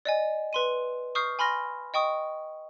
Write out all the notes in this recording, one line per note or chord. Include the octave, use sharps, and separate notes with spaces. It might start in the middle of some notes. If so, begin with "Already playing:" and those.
D5 D#5 G#5
B4 C6 D#7
C#6 D#6 F6 G6 C7
G#5 B5 C6 F6 A#6
D#5 G5 C#6 D#6